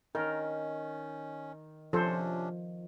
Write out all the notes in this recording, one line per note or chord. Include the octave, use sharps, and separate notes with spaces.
D#3 C#4 A#4
C3 F3 C#4 D4 A4 C5